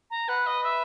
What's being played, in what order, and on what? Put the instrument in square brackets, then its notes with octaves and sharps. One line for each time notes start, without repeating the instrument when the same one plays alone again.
[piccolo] A#5
[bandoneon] B4 [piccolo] F#5
[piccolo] D#5
E5